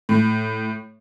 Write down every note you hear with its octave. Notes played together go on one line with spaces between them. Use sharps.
A2